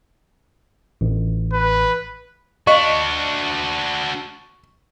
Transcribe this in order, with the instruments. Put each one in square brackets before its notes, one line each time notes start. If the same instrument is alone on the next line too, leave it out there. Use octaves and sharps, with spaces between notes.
[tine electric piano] A1
[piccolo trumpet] B4
[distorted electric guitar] D4 F#4 [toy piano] D#5 F5 [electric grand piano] C#6